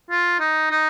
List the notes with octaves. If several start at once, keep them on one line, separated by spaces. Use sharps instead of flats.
F4
D#4
D#4